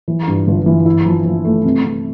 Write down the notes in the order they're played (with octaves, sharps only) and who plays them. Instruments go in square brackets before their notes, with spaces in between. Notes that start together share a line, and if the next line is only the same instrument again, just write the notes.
[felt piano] E3
G2
G1
E3
E4
F3
F3
A3
C3
C3